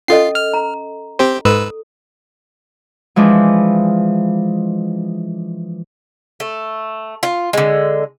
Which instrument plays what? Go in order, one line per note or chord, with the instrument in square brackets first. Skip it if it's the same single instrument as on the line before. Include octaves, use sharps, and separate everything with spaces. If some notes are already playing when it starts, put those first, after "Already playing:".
[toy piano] C#4 A4 D#5 [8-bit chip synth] F4 C7
[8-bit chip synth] F6
[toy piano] A#5
[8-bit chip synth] C4 G4 C5
[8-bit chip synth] G#2 B4 E6 [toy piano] A4
[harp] E3 F3 G#3 D4
[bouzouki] A3
F4
D3 G#3